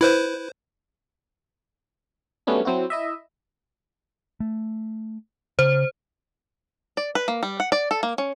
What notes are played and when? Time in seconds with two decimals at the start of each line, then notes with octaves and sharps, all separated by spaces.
0.01 E4 B4 C5
2.47 F#3 G3 A3 B3 C#4 D4
2.65 F#3 C4 E4 F#4
2.90 E4 D#5 E5
4.40 A3
5.59 C#3 C5
6.97 D5
7.15 B4
7.28 A#3
7.43 G3
7.60 F#5
7.72 D5
7.91 A4
8.03 A#3
8.18 C#4